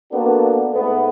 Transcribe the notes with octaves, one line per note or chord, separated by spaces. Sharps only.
A#3 B3 D4 F#4 A4
G#2 A3 B3